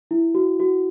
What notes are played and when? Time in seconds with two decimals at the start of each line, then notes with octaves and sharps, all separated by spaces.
0.11 E4
0.35 F#4
0.60 F#4